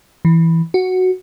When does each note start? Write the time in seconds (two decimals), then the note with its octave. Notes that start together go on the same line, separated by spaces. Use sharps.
0.25 E3
0.74 F#4